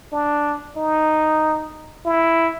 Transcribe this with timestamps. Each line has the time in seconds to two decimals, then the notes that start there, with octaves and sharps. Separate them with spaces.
0.12 D4
0.77 D#4
2.05 E4